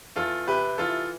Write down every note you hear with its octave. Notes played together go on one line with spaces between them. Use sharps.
E2 F4 A4
C3 G4 B4
E3 F4 A4